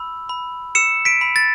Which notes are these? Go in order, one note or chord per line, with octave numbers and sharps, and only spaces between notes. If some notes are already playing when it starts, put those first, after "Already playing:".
Already playing: B5 E6
B5
E6 C#7 E7
B6 D7
B5
A6